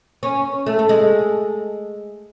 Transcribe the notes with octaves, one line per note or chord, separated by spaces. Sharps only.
C#4
A3
A3
G#3